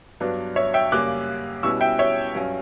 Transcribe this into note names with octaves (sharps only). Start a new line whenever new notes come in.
G2 F#3 B3 D4
C#5 E5
E5 G5
F#2 C#3 G3 A#3 C#4 D6 F#6
B2 G3 C#4 E4 C#6 E6
E5 G5
C#5 E5
G2 F#3 C#4